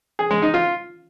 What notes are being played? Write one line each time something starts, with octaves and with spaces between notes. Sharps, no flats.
G#4
G#3
D#4
F4